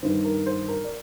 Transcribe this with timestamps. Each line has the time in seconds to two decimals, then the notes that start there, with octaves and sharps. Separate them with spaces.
0.02 G2 D#3 C5
0.25 A#4
0.46 C5
0.68 A#4
0.84 D5